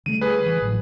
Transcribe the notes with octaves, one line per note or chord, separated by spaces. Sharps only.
D3 G3 A3 D#7
G#4 B4
E3
A1 A2 F#3